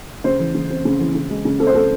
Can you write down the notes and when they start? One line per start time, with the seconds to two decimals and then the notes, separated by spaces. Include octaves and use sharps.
0.24 C#3 C5
0.39 E3
0.55 C#3
0.70 C4
0.85 C#3
0.99 E3
1.15 C#3
1.30 G#3
1.45 C#3
1.60 C4 A4
1.67 C5
1.75 C#3 A4